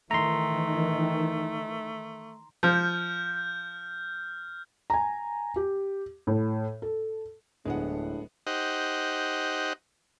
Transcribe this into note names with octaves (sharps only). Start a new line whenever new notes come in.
D#3 E3 A3 A#5 C6
F3 F6 G6
G#5 A#5
G4
A2
A4
D1 A2 G#3 B3 D4 F#5
D#4 G4 C5 D#5 F#5